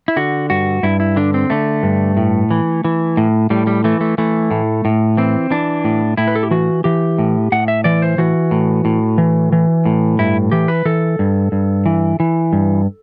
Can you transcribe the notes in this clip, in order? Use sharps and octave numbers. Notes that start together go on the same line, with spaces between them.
E4
D3 F#4
G2 F#4
G2 E4
E4
D3 D4
C4
D3 A3
G2
A2
E3
E3
A2
A2 G3
G3
E3 A3
A3
E3 A3
A2
A2
E3 C4
E3 D4
A2
A2 E4
B4
A4
G4
E3 F#4
E3 G4
A2
A2 F#5
E5
E3 D5
C5
E3 F#4
A2
A2
E3
E3
A2
G2 E4
E3 G4
B4
E3 A4
G2
G2
E3
E3
G2